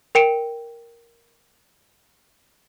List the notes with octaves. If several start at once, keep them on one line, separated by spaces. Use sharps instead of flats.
A#4 G5 C#7 D7 E7